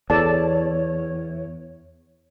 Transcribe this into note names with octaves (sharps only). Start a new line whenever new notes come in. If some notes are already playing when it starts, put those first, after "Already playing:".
E2 A4 C#5 D5 A5